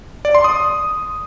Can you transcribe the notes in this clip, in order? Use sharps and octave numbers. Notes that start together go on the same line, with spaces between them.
D5
C6
D#6